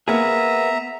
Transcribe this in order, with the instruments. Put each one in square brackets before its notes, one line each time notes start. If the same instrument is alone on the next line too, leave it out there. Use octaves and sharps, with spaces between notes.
[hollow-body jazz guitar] A#3 B3 G#4 [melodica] E5 A#5